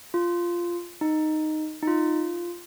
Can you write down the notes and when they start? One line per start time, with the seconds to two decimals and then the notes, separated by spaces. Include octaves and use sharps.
0.14 F4
1.01 D#4
1.83 D#4
1.87 F4